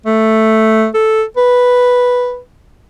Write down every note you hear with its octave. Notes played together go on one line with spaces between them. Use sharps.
A3
A4
B4